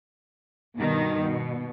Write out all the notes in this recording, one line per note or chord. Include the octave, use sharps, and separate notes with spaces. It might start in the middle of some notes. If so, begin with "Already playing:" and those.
G2 B2 D#3
B2